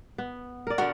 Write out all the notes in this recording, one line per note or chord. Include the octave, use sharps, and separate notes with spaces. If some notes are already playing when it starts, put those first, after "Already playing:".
B3
A#4 D5
D3 B3 F#4 A#4